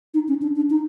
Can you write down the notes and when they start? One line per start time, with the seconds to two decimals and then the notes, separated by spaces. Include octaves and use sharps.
0.14 D#4
0.28 C#4
0.42 D4
0.56 D4
0.70 D#4